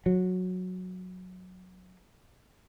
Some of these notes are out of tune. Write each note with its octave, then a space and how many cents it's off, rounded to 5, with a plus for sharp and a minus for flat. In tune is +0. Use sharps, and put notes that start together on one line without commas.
F#3 -10